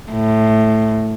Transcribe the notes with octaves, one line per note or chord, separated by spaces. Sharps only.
A2